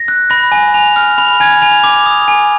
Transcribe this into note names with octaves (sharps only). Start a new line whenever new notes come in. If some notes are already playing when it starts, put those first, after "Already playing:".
Already playing: A#6
F#6
B5 A#6
G#5
G#5 F7
F6
B5 F7
G#5 G#6
G#5 F7
D6 F7
D#6
G#5